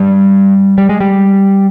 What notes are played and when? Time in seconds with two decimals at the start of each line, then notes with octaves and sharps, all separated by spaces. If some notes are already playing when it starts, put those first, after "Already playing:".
Already playing: G2 G3
0.78 G3
0.89 G#3
1.00 G3